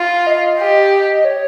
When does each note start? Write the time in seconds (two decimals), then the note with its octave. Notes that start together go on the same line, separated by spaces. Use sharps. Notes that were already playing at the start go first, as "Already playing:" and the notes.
Already playing: F4
0.09 F5
0.27 D#5
0.59 G4
1.25 C#5